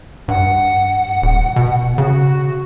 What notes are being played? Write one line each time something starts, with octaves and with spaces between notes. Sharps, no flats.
G2 F#5
D#1
B2
C#3 F#4